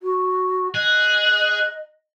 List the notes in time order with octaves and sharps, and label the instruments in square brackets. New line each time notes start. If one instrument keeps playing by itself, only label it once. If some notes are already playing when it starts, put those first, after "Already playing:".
[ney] F#4
[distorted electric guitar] G#4 [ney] D#5 [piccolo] F#6